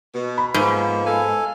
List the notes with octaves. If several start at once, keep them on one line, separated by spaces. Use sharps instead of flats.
B2
B5
G#2 F3 A#3 B3
A4 F5 G#5